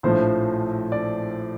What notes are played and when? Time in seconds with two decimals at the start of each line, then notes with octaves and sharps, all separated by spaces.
0.03 A#1 A2 F3 C5
0.92 D5